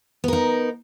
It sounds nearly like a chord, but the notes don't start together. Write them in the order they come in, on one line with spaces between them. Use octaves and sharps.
B3 A#4 D#4